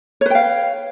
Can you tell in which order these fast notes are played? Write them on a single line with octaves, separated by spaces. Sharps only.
C#5 B4 G5 F5